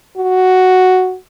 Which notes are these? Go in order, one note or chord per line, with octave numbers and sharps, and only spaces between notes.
F#4